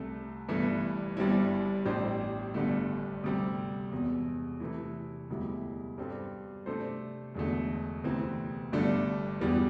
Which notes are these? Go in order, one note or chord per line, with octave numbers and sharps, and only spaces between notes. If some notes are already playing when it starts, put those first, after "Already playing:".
Already playing: C2 C3 A3
G1 G2 E3 A3 E4
G1 G2 G3 C4 E4
A1 A2 G3 D4 C5
G1 G2 D3 A3
D2 C3 G3 C4
E1 E2 C3
C3 E3 A3 E4
E1 D2 C3 G3 E4
G2 G3 C4 A4
C3 A3 D4 A4 C5
E1 E2 D3 A3
D2 C3 E3 C4
G1 G2 D3 A3 D4
E1 E2 E3 G3